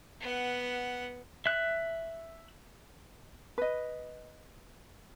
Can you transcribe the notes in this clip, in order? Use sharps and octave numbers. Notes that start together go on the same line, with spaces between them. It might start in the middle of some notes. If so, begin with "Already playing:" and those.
B3 F#5
E5 F#6
B4 D#5